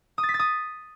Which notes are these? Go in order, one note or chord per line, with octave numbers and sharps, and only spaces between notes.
D#6
A6
B6
A6
D#6